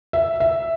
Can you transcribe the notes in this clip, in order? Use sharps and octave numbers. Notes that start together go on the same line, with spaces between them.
E5
E5